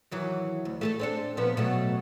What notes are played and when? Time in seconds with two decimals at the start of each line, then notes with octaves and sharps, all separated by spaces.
0.11 D#3 E3 F#3
0.65 D2
0.81 A3 G4 A4
0.99 C4 D4 A4
1.37 A#2 F3 B3
1.57 B2 F#3 A3